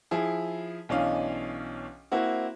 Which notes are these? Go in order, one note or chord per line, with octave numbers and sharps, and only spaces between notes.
F3 E4 G#4
B1 E3 C#4 D4 D#5 F5
A#3 C4 E4 F#4